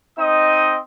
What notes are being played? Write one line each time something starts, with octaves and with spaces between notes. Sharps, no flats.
C4 D#4 D#5 D#6